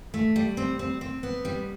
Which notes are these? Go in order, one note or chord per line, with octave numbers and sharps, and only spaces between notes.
A3
G3
C4
C4
C4
B3
G3